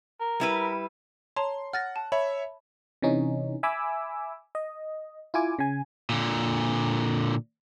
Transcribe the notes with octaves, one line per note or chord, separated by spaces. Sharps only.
A#4
G3 E4 B4
C#5 A5 A#5 C6
F#5 F6 A6 A#6
A5
C#5 E5 B5
C3 E3 C#4 D#4
E5 G#5 B5 D6 E6
D#5
E4 F4 G#5 D6
C#3 G#5
A#2 D3